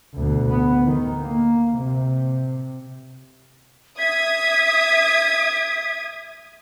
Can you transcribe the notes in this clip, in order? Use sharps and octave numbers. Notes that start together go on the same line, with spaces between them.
D2 B2
B3
D#3
A#3
C3
E5 D#6 G#6 B6